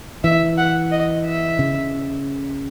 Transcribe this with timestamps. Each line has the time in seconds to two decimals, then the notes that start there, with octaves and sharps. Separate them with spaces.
0.24 E3 E5
0.57 F#5
0.91 D#5
1.25 E5
1.59 C#3